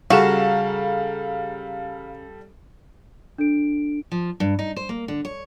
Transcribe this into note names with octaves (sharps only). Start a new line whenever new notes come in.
C#3 G3 F#4 A4 F5 A#5 E7
D4 A4 D7
F3
G2
D#4
C5
A#3
D3
C#5